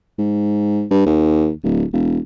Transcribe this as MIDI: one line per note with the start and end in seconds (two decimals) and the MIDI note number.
0.19 0.85 44
0.91 1.05 43
1.07 1.51 39
1.64 1.84 26
1.93 2.19 28